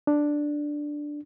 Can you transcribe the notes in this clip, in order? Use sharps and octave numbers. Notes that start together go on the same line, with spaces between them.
D4